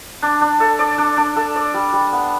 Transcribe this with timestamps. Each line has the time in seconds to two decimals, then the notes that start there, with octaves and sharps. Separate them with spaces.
0.22 D4
0.41 D4
0.60 A4
0.79 D5
0.98 D4
1.17 D4
1.36 A4
1.56 D5
1.74 G3
1.93 G3
2.13 B3